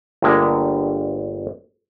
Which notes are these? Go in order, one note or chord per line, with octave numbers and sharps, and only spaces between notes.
G1 G2 D3 G#3 A#3 A#4